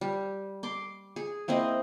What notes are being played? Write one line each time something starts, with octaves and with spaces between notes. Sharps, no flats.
G3
C6 D6
G#4
A#3 C4 E4 D#5